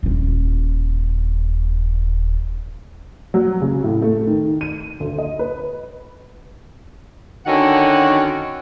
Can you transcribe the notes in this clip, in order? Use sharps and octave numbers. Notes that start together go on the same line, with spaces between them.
D#1 F4
F#3
C#3
A2
A3
D#3
D#7
D2
D#5
B4
D3 D#3 C#4 F#4 A4 F#5